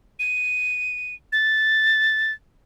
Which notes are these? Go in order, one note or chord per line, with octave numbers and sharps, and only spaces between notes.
D#7
A6